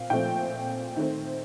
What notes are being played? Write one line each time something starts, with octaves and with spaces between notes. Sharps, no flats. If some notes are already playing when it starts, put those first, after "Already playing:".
Already playing: A#2 C4 F5
A#2 F3 A3 C4 G5
D#3 A3 C4